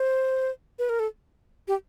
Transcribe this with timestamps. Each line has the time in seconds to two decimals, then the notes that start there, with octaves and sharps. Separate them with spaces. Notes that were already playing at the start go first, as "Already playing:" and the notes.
Already playing: C5
0.79 B4
0.89 A#4
1.00 A4
1.68 G4